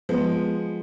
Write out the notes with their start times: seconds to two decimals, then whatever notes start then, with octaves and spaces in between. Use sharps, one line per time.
0.09 F3 G#3 B3